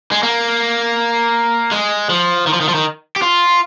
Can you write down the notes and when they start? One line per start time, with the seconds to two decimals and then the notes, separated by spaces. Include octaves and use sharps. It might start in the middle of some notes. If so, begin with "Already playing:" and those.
0.12 G#3
0.23 A#3
1.72 G#3
2.10 F3
2.47 D#3
2.53 F3
2.61 D#3
2.69 F3
2.75 D#3
3.16 G4
3.22 F4